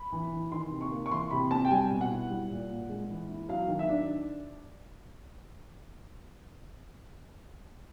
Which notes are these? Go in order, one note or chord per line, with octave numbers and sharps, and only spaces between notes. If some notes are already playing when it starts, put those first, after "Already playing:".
Already playing: B5
E3
E3
D#3 C6
C3
C#6
A#3
C#6
E3 C6
C3 B5
C4 A5
G5
G3 G#5
B2
F#5
E4
G3
A#2
A#2
G#3
E3
E4
F#3 F5
D#3
E5
D4